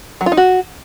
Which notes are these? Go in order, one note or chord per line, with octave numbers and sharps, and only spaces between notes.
F#3
F4
D#4
F#4